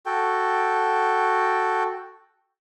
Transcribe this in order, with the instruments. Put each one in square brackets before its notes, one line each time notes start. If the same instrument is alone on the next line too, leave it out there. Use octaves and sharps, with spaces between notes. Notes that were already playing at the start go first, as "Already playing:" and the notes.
[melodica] F#4 A4 G5